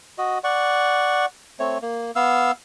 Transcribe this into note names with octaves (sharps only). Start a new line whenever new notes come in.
F#4 D#5
D5 F#5 C#6
A3 C4 C#5
A#3
B3 F5 E6